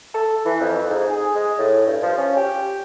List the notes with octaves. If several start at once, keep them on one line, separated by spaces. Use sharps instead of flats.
A4
E3
F2
G#2
G#4
G#3
A2
G2
F3
C#4
G4